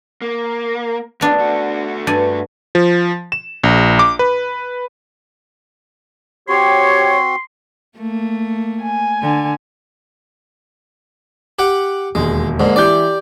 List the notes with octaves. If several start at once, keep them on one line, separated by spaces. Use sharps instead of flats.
A#3
A2 C#3 B3 D4
A3 F#4
G2 D5 G#5
F3
E7
A#1
D6
B4
C4 F#4 G4 C#5 C6
A3 A#3
G#5
D3
G4 F#5 G5
E1 D#2 G#3
G#2 D3 G#3 A#3
E3 E4 G4 D5 G6